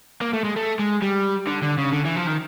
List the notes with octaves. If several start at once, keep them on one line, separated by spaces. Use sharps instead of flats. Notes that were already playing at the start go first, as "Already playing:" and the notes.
A#3
A3
G#3
A3
G#3
G3
D3
D3
C#3
D3
E3
F3
D#3